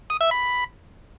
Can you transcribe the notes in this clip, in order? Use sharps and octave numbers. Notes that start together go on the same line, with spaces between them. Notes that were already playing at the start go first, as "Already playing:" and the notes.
D#6
E5
B5